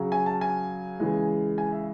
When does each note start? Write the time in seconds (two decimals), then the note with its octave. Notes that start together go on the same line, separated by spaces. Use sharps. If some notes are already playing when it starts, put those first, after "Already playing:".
Already playing: C#3 F#3
0.12 G#5
0.26 A5
0.41 G#5
1.00 C#3 E3 G#3
1.58 G#5
1.72 E5